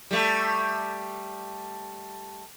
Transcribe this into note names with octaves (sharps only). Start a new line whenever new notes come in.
G3 A3